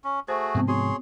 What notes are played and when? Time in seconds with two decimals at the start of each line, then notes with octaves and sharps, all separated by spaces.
0.04 C#4
0.28 A3 F#4 G#4 C5
0.55 G#2 C3 F3 B3 C4
0.68 F#4 G#4 C#5 C6